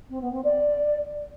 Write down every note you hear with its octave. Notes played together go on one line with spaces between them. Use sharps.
C4
B3
C4
D5